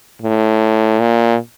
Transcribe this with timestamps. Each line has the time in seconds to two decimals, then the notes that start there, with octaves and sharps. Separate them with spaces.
0.22 A2
1.00 A#2